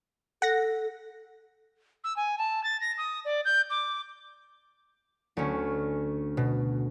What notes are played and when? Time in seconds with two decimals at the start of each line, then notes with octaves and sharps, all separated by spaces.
0.42 A4 F#5 A#6
2.04 E6
2.16 G#5
2.38 A5
2.64 A6
2.81 A#6
2.98 D#6
3.25 D5
3.45 G6
3.70 D6
5.37 D2 C#4
6.37 B2